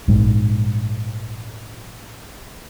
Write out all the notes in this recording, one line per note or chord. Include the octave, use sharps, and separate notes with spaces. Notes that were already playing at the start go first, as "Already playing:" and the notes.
A#1 G#2